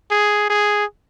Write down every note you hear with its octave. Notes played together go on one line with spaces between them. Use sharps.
G#4
G#4